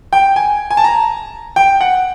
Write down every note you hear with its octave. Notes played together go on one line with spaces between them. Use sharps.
G5
G#5
G#5
A5
A#5
G5
F#5